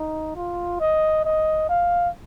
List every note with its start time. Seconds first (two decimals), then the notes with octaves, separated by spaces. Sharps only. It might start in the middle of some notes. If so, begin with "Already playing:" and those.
Already playing: D#4
0.35 F4
0.80 D#5
1.25 D#5
1.69 F5